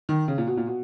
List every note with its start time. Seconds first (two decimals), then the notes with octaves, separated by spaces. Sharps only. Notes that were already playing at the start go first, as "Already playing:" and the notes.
0.09 D#3
0.28 C#3
0.38 A#2
0.47 B2
0.57 A#2
0.67 B2